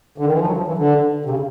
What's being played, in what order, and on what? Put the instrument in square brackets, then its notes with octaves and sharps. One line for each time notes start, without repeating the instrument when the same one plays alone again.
[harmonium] D3
D#3
E3
F3
F#3
F3
E3
D3
C3
C#3